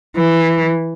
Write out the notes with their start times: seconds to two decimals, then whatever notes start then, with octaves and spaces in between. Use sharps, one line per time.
0.17 E3